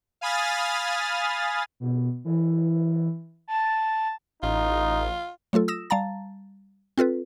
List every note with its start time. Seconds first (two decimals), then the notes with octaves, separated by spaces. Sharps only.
0.21 F5 G#5 B5 D#6 F6 A6
1.80 B2
2.25 E3
3.48 A5
4.43 A1 D#4 F4
5.53 F#3 A3 F4 A4
5.68 D#6 E6 A#6 E7
5.90 G3 F5 A5 A#5 A6
6.98 C4 F4 A4 B4